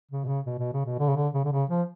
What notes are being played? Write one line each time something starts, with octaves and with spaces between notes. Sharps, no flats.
C#3
B2
C#3
B2
B2
C#3
B2
D3
C#3
D3
C#3
D3
C#3
F3